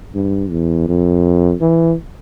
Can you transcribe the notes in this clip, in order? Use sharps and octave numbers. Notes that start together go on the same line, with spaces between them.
G2
E2
F2
E3